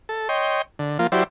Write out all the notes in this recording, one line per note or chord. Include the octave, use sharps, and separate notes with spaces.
A4
C#5 D#5 G5 C6
D3
F3 A#3 F4
F#3 E4 G4 C5 D5